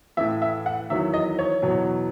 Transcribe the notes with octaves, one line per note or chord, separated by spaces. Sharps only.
A2 E3 E5
E5
F#5
E2 D#3 F#3 E5
D#5
C#5
E2 B2 F#3